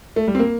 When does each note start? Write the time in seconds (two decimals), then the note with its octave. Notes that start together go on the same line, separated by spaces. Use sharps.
0.16 A3
0.28 G3
0.35 C4
0.39 A#3